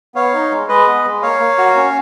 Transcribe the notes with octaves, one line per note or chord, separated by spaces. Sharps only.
B3 C#5 F5
D#4
G#3
G#3 B4 D#5
B3
G#3
A#3 C#5 F5
A#3
F#4
C#4